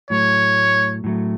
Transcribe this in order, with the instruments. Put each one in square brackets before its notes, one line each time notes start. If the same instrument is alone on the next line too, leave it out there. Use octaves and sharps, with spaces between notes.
[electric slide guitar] A2 F#3 A3 [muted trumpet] C#5
[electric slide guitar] A2 F#3 A3